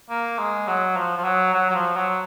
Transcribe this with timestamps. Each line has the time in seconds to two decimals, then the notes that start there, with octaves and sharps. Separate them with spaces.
0.10 A#3
0.39 G#3
0.68 F#3
0.96 F3
1.17 F3
1.24 F#3
1.54 F#3
1.70 F#3
1.75 F3
1.96 F#3